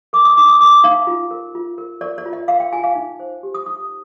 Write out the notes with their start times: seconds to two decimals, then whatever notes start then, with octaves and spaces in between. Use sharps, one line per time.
0.13 A#4 D6
0.25 D#6
0.37 D#4 D6
0.49 D#6
0.61 A#4 D6
0.84 D#4 F5
1.07 F4
1.31 A#4
1.55 F4
1.78 A#4
2.01 A#4 D5
2.18 D5
2.26 F4
2.33 D#5
2.48 A#4 F5
2.60 G5
2.73 F4 G#5
2.83 F5
2.95 D#4
3.20 C5
3.43 G4
3.54 D#6
3.66 D#4 D#6